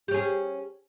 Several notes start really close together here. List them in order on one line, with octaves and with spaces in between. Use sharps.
G4 C#4 G#4